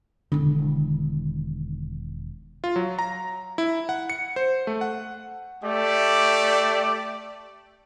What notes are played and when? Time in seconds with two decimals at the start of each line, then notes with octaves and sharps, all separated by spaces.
0.32 E1 D3 D#3
2.64 F4
2.76 F#3
2.99 A#5
3.58 E4
3.89 F#5
4.10 C#7
4.36 C5
4.67 A3
4.81 F#5
5.63 A3 G4 D5